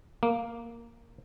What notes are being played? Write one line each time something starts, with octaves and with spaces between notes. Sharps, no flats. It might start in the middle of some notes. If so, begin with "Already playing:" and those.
A#3